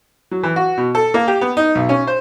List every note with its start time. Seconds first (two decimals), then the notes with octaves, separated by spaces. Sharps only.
0.31 F#3
0.43 E3
0.56 F#4
0.78 B2
0.95 A4
1.14 A#3
1.28 G4
1.41 B3
1.57 D#4
1.75 B1
1.89 C#4
2.07 C5